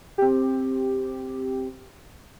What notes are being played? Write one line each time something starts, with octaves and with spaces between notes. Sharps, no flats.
C4 G4